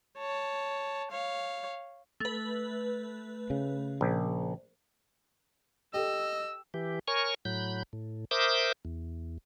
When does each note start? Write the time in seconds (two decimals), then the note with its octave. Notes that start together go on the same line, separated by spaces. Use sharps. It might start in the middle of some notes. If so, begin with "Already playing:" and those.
0.18 C#5 A5
1.11 C#5 F5
2.20 A3 B4
3.50 C#3
4.01 A#1
5.94 G4 A4 D#5 E6
6.74 E3 G4
7.08 A#4 C#5 G#5 C#6
7.45 A2 F#3 B5 G6
7.93 A2
8.31 A#4 C5 E5 D6 D#6 G6
8.85 E2